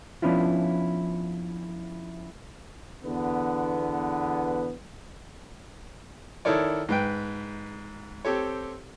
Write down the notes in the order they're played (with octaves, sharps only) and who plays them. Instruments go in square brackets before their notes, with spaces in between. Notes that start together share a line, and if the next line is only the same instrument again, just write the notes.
[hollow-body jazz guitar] F3 B3 C#4 D4 E4 F4
[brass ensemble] E2 D3 B3
[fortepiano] D#3 E4 A4 A#4 C#5 D5
G#2 B4 G5
C4 G4 A4 C#5